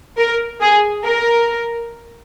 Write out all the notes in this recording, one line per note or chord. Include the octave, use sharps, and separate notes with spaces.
A#4
G#4
A#4